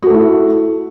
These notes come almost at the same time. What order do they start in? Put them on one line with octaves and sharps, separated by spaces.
F#4 A4 A3 E4